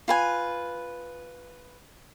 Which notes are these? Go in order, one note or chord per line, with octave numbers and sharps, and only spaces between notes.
F4 B4 G#5